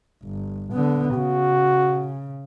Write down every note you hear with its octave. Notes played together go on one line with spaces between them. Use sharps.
G1
D3 B3
C#3 F#4